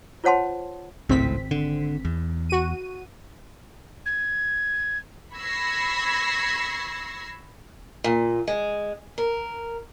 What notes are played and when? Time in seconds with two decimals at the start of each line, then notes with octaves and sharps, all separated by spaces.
0.24 F4 C5 C#5 F#5 A5 C6
1.09 G#1 C#2 A2 C4 B6
1.51 D3
2.05 E2
2.49 F#4 D#7
4.06 G#6
5.35 B5 C#6 E6 G#6 A#6 C7
8.04 A#2
8.48 G#3
9.18 A#4